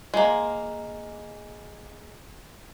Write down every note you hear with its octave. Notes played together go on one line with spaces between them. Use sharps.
G#3 A#3